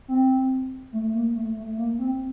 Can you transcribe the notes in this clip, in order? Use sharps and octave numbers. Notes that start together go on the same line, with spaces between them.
C4
A3
A#3
A3
A3
A#3
C4